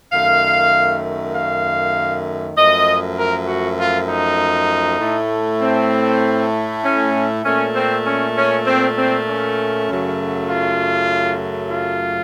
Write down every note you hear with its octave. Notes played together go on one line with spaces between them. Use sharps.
F#2 D#3 A3 F5
F5
F#2 F3 A3 D#5
A#4
F#4
F4
D#4
A2 A3
C4
C#4
A#2 A3 C#4
C4
C#4
C#4
C4
C4
C#4
F#2 C#3 F#3 A3
F4
F4